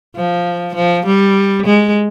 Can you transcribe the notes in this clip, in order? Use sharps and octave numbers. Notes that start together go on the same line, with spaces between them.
F3
F3
G3
G#3